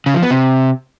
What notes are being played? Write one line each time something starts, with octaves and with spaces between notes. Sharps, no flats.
C#3
F3
B3
C3